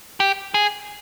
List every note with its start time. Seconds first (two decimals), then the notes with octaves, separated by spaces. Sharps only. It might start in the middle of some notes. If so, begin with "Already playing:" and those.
0.20 G4
0.54 G#4